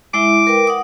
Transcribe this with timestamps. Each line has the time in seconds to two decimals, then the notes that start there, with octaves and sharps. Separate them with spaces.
0.14 G#3 E4 E5 D6
0.47 A#4 B4 G5
0.67 F#5 D#6